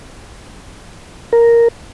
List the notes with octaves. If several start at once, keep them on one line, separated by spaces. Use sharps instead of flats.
A#4